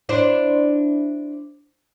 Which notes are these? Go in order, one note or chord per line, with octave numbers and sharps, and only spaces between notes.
D4 E4 C5